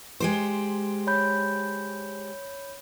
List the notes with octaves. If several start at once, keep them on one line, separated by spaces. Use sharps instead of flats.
G#3 G4 C5
C#5 B5 G6